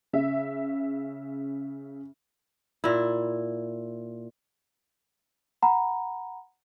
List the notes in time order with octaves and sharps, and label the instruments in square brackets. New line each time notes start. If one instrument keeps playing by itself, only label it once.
[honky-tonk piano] C#3 E5
[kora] A#2 E4
[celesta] F#5 A#5 B5